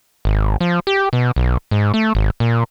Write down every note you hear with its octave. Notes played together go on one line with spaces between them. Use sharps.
G#1
F3
G4
B2
B1
G#2
A3
G#1
A#2